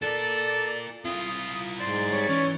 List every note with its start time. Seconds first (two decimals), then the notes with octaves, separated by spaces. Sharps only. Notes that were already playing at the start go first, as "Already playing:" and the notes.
0.02 F4 A4 A#4 D5
1.05 C4 E4 F4 D#6
1.80 G#2 D5 C6
2.11 G3 C#5
2.29 E3 C#4